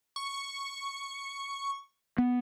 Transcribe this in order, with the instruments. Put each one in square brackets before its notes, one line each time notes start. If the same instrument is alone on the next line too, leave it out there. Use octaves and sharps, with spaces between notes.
[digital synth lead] C#6
[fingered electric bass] B3